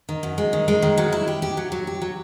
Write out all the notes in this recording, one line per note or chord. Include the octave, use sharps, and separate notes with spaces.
D#3
F#2
G#3
D#3
G#3
D#3
F#3
E4
G4
G4
F#3
F#3
G4
F#3